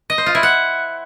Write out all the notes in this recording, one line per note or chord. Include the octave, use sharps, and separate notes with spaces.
D#5
C5
F4
E4
F#5